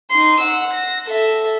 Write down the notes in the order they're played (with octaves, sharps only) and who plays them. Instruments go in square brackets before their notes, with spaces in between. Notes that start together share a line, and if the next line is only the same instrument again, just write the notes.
[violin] D#4 C6
F#5 E6
A#6
A4 E5